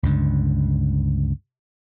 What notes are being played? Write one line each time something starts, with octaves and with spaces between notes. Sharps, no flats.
C#2 G2 D3